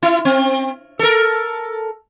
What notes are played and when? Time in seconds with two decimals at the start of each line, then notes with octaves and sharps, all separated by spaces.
0.03 E4
0.25 C4
0.99 A4 A#4